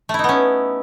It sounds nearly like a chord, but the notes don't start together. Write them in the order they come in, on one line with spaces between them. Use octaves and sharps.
A3 E4 D#4 B3 C#4